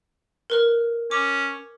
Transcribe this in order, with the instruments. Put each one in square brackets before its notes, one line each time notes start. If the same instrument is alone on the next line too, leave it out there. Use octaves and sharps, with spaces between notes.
[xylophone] A#4 B4 F6
[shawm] C#4 [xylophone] D6